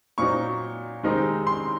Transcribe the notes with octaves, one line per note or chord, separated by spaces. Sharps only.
A#2 F#3 C4 D#4 C#6
C3 D#3 G#3 C4 D#4
C6